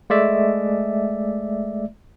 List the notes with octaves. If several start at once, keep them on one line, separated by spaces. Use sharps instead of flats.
G#3 A3 D5 E5